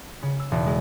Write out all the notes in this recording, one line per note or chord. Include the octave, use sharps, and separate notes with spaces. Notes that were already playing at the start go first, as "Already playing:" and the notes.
C#3
E6
E1
G#3